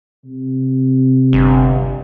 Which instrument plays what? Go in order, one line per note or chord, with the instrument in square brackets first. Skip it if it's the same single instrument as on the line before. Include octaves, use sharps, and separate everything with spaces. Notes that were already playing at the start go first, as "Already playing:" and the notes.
[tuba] C3
[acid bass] G1